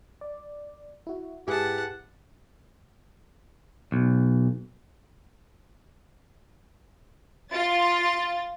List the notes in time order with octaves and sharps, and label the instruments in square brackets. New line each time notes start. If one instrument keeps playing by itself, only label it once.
[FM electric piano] D5
E4 F#4
[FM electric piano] G#2 [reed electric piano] E4 G#4 B4 [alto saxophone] G4 [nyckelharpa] F#5 A5
[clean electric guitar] B1
[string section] F4 A6